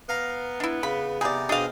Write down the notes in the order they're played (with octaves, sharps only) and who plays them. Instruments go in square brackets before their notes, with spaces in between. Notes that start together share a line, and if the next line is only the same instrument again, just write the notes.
[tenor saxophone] B3 [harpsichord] F5 A#5
[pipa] D4 E4
[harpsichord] C#3 [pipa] B5
[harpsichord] C3 B3 D#4 [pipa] G#4 D5
[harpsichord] B2 C4 G#4 [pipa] D4 F5 [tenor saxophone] D#5